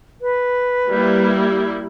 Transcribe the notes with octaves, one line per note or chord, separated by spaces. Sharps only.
B4
G3 A#3 E4